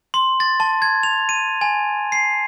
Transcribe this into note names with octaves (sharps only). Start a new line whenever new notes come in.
C6
A6
A5
G#6
F7
D#7
G#5
C7